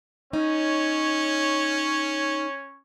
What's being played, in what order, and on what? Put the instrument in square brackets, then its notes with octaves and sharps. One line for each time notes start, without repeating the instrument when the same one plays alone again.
[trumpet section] C#4 C#5 [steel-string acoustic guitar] D#4